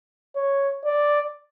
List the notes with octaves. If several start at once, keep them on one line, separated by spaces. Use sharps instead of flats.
C#5
D5